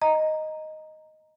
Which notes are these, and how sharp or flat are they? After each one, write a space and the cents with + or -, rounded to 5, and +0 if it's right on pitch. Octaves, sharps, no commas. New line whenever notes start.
D#5 +0 A#5 +0